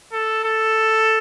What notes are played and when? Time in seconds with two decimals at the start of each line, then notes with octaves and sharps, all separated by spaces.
0.12 A4
0.44 A4